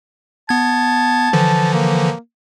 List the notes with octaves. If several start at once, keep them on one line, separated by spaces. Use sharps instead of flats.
B3 A5 G#6
D3 E3 F3
A#3